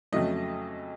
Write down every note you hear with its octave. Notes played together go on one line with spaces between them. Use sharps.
F2 C#3 F#3 A3 D#5